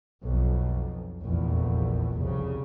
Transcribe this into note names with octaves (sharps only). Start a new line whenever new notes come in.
B1 F2
F1 A#1 E2
C2 C#3